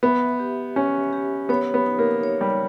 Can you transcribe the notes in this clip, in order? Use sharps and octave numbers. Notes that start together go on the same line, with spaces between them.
B3 E5
G4
C#4 G4
G4
B3 C#5
B3
D#4
A#3
C#5
G3